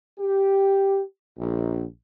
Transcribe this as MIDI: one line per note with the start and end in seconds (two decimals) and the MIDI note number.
0.19 1.01 67
1.37 1.84 34